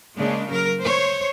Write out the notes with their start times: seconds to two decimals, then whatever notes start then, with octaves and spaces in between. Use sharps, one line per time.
0.17 C#3 G#3 A#3 D4
0.49 F#3 A#4
0.82 C5 C#5